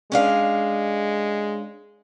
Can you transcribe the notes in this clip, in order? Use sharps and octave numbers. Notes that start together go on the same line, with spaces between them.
G#3 C#4 D4 F5